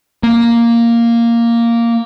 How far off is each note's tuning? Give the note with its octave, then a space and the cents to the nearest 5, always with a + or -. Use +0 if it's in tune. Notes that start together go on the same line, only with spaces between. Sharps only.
A#3 +0